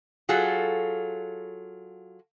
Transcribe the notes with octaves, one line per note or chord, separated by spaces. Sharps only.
F#3 F4 F#4 G#4 A4